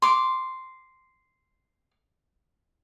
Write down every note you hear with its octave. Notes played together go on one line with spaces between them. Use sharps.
C6 D6